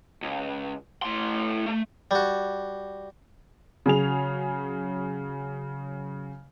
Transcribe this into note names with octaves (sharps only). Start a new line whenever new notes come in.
C#2
A2 C6
A3
G3 F#4
C#3 F#3 G#4 F7